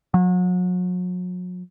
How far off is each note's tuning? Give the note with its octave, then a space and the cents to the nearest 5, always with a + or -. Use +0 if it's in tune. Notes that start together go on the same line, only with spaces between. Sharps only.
F#3 -40